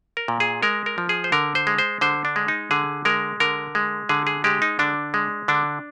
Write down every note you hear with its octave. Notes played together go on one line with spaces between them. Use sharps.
A#4
A#2
G#4
G#3 A#4
A#4
F3
G#4
C5
D3 A#4
C5
G#3
C5
D3 C5
D4
G#3
D#4
D3 G#4
G#3 A#4
D3 A#4
G#3
D3 G#4
G#4
G#3 G4
D#4
D3 D4
G#3
D3 D4